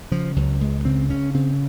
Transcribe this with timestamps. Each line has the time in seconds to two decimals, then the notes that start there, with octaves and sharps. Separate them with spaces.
0.11 C#3 F3
0.36 C#2 F#3
0.61 C#2 G#3
0.85 C#3 C4
1.10 C#3 C#4
1.34 C#3 C4